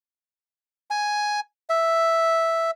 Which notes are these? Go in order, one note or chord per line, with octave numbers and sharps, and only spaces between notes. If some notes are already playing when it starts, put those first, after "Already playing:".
G#5
E5